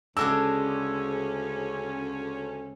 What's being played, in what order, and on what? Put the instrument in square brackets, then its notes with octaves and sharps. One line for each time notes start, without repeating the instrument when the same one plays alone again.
[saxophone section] D2 C#4 [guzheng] C#3 G#3 D4 [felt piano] E6